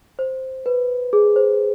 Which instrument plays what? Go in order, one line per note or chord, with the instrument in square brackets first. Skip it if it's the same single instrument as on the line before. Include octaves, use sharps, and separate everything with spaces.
[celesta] C5
B4
G#4
C5